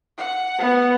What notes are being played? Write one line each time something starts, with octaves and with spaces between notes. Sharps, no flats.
F#5
B3